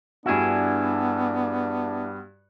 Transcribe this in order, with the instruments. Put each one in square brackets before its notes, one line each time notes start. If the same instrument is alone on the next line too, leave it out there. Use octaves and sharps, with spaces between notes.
[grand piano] G2 F#4 [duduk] B3 [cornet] D4 [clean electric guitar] E4 G#4